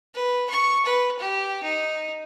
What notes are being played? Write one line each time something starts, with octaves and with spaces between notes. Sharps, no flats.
B4
C#6
B4
G4
D#4